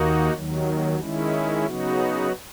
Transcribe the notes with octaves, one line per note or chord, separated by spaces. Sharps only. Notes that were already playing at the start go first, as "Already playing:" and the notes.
Already playing: D#2 D#3 A#3 D#4 F#4
D#2 D#3 F#3
D#3 G#3 C#4 E4
C#3 F#3 B3 D#4 F#4